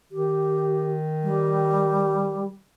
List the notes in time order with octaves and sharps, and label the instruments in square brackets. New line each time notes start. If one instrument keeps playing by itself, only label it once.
[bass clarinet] D#3 [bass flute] G4
[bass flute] G3